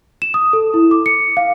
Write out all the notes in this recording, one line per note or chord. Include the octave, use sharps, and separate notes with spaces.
E7
D#6
A4
E4
D6
C#7
F5